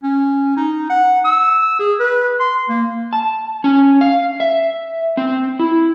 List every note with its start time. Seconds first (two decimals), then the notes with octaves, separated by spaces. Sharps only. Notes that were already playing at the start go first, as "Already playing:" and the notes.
0.03 C#4
0.57 D#4
0.89 F#5
1.25 E6
1.79 G#4
1.99 B4
2.40 C6
2.69 A#3
3.13 A5
3.64 C#4
4.01 F5
4.40 E5
5.17 C4
5.59 E4